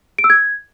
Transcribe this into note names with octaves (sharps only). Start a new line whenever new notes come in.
D7
E6
G#6